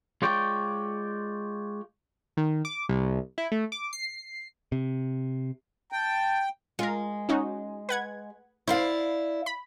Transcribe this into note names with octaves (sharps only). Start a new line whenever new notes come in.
G#3 F4 C#5 D5 G5
D#3
D6
C2
E4
A3
D6
C7
C3
G5 A5
G#3 F4 A#4
C#4 D#4 F#4
B4 F#5 G#6
E4 C5 D5 F5
B5